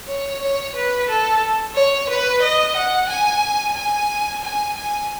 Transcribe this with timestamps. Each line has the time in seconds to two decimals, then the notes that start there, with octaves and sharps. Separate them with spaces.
0.08 C#5
0.42 C#5
0.76 B4
1.09 A4
1.75 C#5
2.09 B4
2.42 D#5
2.76 F#5
3.09 G#5
3.76 G#5
4.43 G#5
4.76 G#5